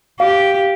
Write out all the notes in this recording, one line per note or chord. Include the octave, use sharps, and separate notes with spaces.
G4 F5